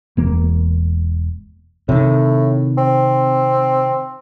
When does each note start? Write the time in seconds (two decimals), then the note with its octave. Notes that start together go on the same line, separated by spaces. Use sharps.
0.17 E1 A#3
1.89 A2 C3 D#3
2.78 C4